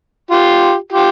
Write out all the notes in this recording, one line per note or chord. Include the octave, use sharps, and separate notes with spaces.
F4 G4
F4 G4